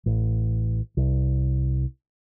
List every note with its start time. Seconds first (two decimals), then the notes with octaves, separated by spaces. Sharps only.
0.06 A1
0.97 C2